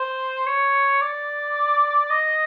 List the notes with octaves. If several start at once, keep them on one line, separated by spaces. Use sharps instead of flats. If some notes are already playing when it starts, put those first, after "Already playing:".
Already playing: C5
C#5
D5
D#5